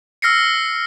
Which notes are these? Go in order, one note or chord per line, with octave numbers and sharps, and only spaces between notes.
E6 F6 A#6 C7 C#7